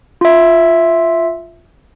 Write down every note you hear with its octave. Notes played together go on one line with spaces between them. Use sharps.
F4 E5